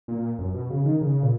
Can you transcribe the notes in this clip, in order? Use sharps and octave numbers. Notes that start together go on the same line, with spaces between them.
A#2
F#2
B2
C#3
D#3
C#3
A#2